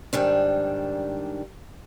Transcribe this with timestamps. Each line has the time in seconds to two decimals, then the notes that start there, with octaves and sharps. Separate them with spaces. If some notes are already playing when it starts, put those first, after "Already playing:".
0.13 G#2 D#3 G3 D4